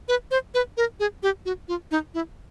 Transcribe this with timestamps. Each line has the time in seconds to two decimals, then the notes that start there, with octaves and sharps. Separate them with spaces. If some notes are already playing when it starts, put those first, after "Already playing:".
0.08 B4
0.31 C5
0.54 B4
0.77 A#4
1.00 G#4
1.23 G4
1.45 F#4
1.68 F4
1.91 D#4
2.14 E4